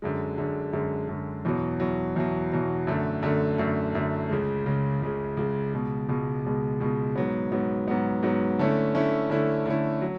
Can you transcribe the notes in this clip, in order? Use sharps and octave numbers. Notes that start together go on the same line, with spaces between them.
F#2 D3 G#3
F#2 D3 G#3
F#2 D3 G#3
F#2 D3 G#3
E2 B2 F#3
E2 B2 F#3
E2 B2 F#3
E2 B2 F#3
F#2 D3 A3
F#2 D3 A3
F#2 D3 A3
F#2 D3 A3
C#2 C#3 G#3
C#2 C#3 G#3
C#2 C#3 G#3
C#2 C#3 G#3
C#2 B2 G#3
C#2 B2 G#3
C#2 B2 G#3
C#2 B2 G#3
G#2 F#3 B3
G#2 F#3 B3
G#2 F#3 B3
G#2 F#3 B3
D3 A3 C#4 E4
D3 A3 C#4 E4
D3 A3 C#4 E4
D3 A3 C#4 E4
F#3